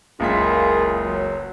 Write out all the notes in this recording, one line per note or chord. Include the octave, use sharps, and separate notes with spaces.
F#1 C#2 A#3 F4 G#4 B6
F#3